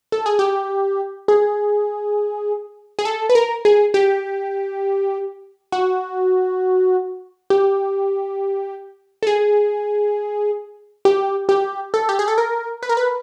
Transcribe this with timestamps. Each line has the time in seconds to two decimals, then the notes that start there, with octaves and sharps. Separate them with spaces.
0.12 A4
0.26 G#4
0.39 G4
1.28 G#4
2.99 G#4
3.05 A4
3.29 B4
3.35 A#4
3.65 G#4
3.94 G4
5.72 F#4
7.50 G4
9.23 A4
9.27 G#4
11.05 G4
11.49 G4
11.94 A4
12.09 G4
12.19 G#4
12.28 A4
12.38 A#4
12.83 B4
12.89 A#4
12.97 B4